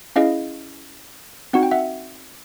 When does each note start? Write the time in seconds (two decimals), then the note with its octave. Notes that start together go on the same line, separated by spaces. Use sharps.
0.16 C#4 E4 G#4 D#5 F5
1.53 C4 D#4 F#4 F#5
1.63 G5
1.71 E5 F#5